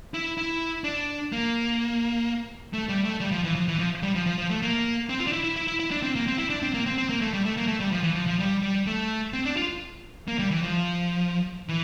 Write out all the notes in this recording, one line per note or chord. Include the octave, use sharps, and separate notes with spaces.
E4
E4
D4
A#3
A3
G3
A3
G3
F3
E3
F3
E3
F3
G3
F3
F3
F3
A3
A#3
C4
F4
D4
E4
E4
E4
E4
E4
D4
C4
A#3
C4
E4
D4
C4
A#3
C4
C4
A#3
A3
G3
A3
A#3
A3
G3
F3
E3
F3
F3
G3
G3
A3
C4
D4
F4
A#3
G3
E3
F3
E3